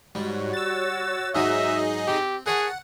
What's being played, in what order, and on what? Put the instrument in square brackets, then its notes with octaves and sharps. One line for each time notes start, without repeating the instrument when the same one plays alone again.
[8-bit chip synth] G#2 [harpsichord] G3 [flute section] F#4 C#5
[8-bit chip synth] E6 A6
[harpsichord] G#2 F#3 D#6 [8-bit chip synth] D#4 G#4 D#5 [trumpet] E5
[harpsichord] C4 [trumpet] G4
[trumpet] G#4 [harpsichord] A#4 C#5 A5 [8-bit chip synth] F#5